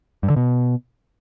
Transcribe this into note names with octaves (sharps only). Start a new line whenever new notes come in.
G2
D3
B2